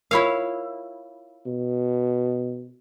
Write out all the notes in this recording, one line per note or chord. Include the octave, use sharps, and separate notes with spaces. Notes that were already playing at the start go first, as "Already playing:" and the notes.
E4 F4 A#4 C#5 F5
B2